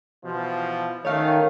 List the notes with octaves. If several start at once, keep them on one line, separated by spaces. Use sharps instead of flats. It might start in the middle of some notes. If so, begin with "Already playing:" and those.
B2 E3 F3
D#3 A3 C#4 D#4 C#5 F5